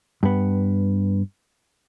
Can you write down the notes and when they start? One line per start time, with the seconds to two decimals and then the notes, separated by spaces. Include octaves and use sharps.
0.23 G2 B3